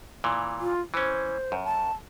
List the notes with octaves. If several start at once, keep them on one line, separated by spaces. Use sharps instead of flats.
A#2 E3
F4
E3 C#4 C5
F#2
A5